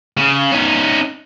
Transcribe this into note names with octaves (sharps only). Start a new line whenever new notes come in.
C#3
C#4 D#4